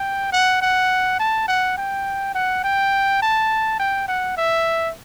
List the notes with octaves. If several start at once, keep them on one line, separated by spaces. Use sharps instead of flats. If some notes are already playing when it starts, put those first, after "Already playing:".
Already playing: G5
F#5
F#5
A5
F#5
G5
F#5
G5
A5
G5
F#5
E5